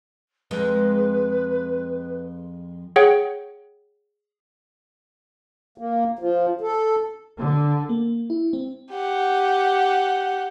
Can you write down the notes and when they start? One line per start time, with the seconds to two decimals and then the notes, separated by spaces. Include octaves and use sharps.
0.51 F2 G#3 B4
2.96 G#4 C#5 F#5 G5
5.78 A#3
6.19 F3
6.61 A4
7.38 D3
7.89 A#3
8.30 E4
8.53 C4
8.92 G4 F#5